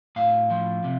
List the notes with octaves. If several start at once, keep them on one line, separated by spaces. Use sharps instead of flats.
A2 F5
F3
C3